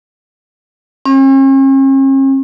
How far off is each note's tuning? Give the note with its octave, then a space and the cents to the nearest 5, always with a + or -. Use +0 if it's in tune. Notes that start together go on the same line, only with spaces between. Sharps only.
C#4 -45